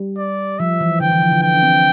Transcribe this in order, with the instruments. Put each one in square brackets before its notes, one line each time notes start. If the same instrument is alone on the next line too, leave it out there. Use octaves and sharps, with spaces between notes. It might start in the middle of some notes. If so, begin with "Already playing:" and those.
Already playing: [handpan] G3
[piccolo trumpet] D5
[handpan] F3 [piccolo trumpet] E5
[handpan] E3
[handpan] D3 [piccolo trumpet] G5
[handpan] E3
F3
D3
[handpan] F3 [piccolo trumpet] G5
[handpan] D4
C4